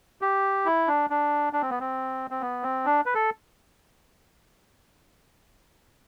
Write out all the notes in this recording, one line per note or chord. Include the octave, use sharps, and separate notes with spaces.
G4
E4
D4
D4
D4
C4
B3
C4
C4
B3
C4
D4
B4
A4